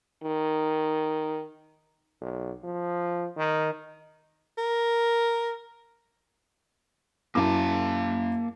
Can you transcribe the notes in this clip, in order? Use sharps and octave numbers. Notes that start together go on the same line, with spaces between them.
D#3
B1
F3
D#3
A#4
F#2 A#3 E4 F5 A5 D6